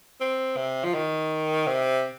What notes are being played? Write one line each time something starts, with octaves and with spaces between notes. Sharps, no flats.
C4
C3
F3
D#3
C3